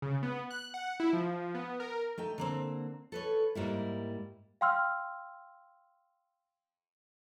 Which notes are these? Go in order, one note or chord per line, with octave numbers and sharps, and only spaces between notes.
C#3
B3
F#6
F#5
E4
F3
B3
A#4
A3 D#4 G5
D3 A#3 C4
A4 B4 C#5
G#2 G3 A#3 E4
F5 G5 C6 E6 F6